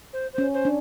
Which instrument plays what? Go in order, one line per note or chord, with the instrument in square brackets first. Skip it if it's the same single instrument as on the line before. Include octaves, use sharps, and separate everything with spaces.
[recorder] C5
C5
[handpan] C#4
[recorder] C5
[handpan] D4